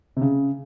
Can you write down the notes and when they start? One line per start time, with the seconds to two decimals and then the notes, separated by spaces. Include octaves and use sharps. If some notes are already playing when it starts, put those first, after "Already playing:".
0.17 C3
0.21 C#3